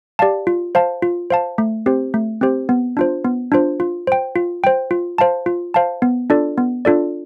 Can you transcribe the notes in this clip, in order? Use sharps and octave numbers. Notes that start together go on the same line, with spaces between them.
G4 D5 F5 A5
F4
C5 F5 A5
F4
C5 F5 A5
A3
C4 G4 C5
A3
C4 G4 C5
B3
D4 F4 C5
B3
D4 F4 C5
F4
C5 G5
F4
C5 G5
F4
C5 F5 A5
F4
C5 F5 A5
B3
D4 F4 A4 D5
B3
D4 F4 A4 D5